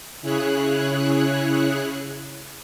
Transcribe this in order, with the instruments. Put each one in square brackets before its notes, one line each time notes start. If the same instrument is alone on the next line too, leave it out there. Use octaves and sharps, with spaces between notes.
[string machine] C#3 E4 G#4 C#5 F#6